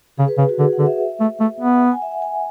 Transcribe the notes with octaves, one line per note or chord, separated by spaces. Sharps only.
C#3 G#4
B4
C#3
F#4
D3 G#4
F#5
D3
E5
A3
A3
B3
F#5
G#5
E5
F#5
G#5